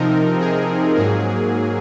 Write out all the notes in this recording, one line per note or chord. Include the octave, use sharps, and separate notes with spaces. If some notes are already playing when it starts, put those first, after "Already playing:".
Already playing: C3 F3 C4 D#4 A#4
G#4
G#2 F#3 A#3 G#4